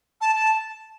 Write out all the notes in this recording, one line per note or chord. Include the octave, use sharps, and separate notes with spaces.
A5
A5